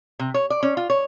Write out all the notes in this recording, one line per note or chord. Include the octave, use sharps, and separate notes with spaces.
C3
C#5
D5
C#4
F4
C#5